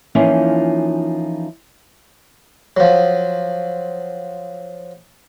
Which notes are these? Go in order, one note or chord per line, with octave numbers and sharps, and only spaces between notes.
E3 F3 A#3 C#4 D#4 F4
F3 F#3